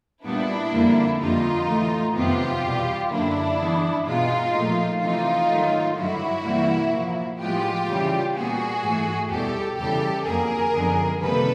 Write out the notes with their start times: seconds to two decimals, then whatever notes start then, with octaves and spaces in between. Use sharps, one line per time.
0.24 A#2 G3 B3 D4 E4
0.72 F2 D3 G3 A#3
1.20 F2 D3 G3 A#3 D#4 F4
1.67 A2 E3 A3
2.15 F2 C3 D#3 F#3 B3 F4 G4
2.62 E2 B2 G3
3.10 F#2 D3 F#3 A#3 D4 E4
3.58 G2 E3 G#3 B3
4.06 B2 G#3 B3 D#4 F4
4.53 A#2 F3 A3
5.01 C3 E3 A3 D#4 F4
5.49 G#2 D#3 F#3 A3
5.96 G2 D3 F#3 E4 F#4
6.44 C3 E3 G3 A#3
6.92 A#2 F3 A#3
7.39 A2 F3 G#3 B3 F4 G4
7.87 C#3 E3 G3
8.35 A#2 G3 B3 F#4 G#4
8.82 G#2 E3 A3
9.30 E2 B2 G3 G4 A4
9.77 E2 C#3 E3 G3 G4 A4
10.26 F2 D3 F#3 A#3 G#4 A#4
10.73 F#2 D3 F3 G#3 B3
11.20 C3 D#3 G3 A#3 A4 B4